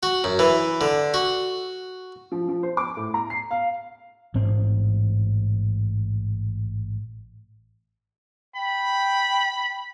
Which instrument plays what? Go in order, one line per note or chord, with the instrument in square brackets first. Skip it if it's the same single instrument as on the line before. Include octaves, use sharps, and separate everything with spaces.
[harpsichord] F#4
F#2
E3
D3
F#4
[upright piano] F3
F3
C5
D6
A2
A#5
C7
F5
[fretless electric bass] A1 G#2 C4
[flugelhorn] G5 [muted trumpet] B5